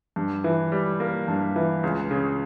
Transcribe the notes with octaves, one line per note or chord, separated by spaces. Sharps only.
G2
E3
G3
A#3
G2
E3
C#2
C#3